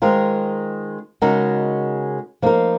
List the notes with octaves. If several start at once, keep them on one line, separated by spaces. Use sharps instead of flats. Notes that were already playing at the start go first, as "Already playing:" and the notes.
D#3 G#3 C4 F4 A#4
C#3 G#3 D#4 F#4 A#4
F3 A#3 D#4 A#4